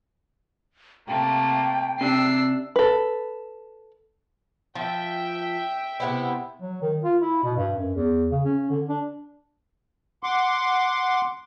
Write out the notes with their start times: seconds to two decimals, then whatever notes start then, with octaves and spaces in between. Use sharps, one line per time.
1.08 C3 A3 A#3 G5
2.01 C3 D4 E6 C7
2.76 A4 B4
4.75 F3 E5 G5
6.00 C3 B3 E4
6.62 F#3
6.82 D#3
7.04 F4
7.21 E4
7.43 B2
7.57 G2
7.77 F#2
7.95 E2
8.31 C#3
8.45 C#4
8.70 D3
8.89 D4
10.23 F#5 C6 D6